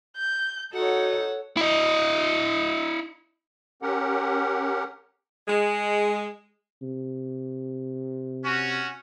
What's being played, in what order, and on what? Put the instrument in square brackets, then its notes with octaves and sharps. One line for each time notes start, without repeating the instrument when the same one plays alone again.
[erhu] G6
[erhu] D#4 [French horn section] F#4 [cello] A4 [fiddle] C#5 F#5
[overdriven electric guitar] E4 D#5
[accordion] C#4 G4 A#4 F#5
[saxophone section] G#3
[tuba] C3
[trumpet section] C#4 F#4